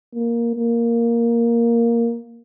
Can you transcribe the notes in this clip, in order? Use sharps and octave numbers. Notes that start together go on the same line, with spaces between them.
A#3
A#3